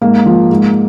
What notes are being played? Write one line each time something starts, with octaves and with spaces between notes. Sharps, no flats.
G#2 A#3
F3
G#2